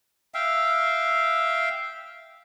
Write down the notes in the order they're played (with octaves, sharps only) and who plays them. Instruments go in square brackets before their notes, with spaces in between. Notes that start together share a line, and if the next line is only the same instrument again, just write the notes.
[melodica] E5 F5 G5